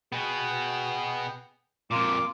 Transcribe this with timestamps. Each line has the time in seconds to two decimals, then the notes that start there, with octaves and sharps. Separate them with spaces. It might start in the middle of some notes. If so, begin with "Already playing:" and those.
0.13 B2 B3 G#4 G5
1.91 F2 A#2 A#3 F4 D6